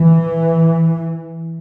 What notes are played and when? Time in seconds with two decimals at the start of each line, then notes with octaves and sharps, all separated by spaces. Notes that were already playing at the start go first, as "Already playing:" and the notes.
Already playing: E3